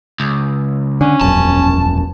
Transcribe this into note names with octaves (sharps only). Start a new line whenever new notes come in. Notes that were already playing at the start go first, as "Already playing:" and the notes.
C#2
D3 C#4
E1 A#1 F#2 A5